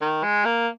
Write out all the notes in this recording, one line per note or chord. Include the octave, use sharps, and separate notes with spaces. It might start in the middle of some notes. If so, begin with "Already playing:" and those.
D#3
G#3
A#3